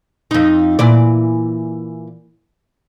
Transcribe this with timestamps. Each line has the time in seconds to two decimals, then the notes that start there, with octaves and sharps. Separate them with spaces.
0.31 F2 D#4
0.79 A#2 E3 D5